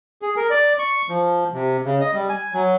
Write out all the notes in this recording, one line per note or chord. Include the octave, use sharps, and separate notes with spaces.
G#4
A#4
D5
C#6
F3
C3
C#3
D#5
G3
G#5
F#3